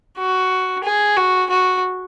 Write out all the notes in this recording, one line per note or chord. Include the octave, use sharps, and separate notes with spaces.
F#4
G#4
F#4
F#4